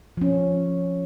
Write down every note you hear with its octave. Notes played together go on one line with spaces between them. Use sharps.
F3 C#4